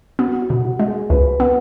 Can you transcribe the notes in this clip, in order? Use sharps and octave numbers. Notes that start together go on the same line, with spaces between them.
B3 F#4
F#4
B2
F#4
G#3
G#4
C#2 B4
B3 B4